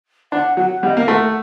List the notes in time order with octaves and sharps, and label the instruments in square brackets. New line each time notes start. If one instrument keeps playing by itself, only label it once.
[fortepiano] D4 [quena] F#5
[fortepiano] F#3 [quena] F#5
[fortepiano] G3 [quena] F#5
[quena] D#5
[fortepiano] A#3
[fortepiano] A3 [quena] F#5